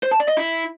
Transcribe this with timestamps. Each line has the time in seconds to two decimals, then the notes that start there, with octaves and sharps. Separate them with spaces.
0.03 C5
0.11 A5
0.20 D5
0.28 D#5
0.37 E4